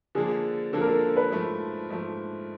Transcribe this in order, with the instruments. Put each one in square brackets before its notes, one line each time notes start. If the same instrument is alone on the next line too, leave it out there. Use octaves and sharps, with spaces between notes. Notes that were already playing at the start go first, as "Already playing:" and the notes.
[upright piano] D3 F3 A#3 D4 [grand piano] G#4
[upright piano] D3 F3 A#3 D4 [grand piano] A4
[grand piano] A#4
A4
B4
[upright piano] G#2 F3 A3
G#2 F3 A3